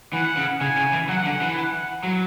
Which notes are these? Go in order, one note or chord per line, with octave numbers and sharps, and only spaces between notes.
E3 F#5
C#3
C#3 G#5
C#3
E3
F#3 F#5
D3
E3
F#5
F#3